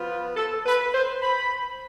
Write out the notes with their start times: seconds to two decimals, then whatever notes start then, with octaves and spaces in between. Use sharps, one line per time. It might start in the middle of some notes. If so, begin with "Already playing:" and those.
Already playing: F3 B3 F4
0.09 B4
0.36 A4
0.66 B4
0.94 C5
1.22 B5